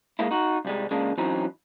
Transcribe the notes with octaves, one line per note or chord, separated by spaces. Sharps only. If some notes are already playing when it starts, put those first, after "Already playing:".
G#3 A#3 E4
D#4 F#4
C2 G3 G#3
C#3 G#3 A#3 D4
E3 F#3 C4 C#4 D#4